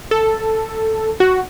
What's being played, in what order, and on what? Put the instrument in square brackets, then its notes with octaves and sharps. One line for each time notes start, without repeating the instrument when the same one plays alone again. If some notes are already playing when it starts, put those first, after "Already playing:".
[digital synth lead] A4
F#4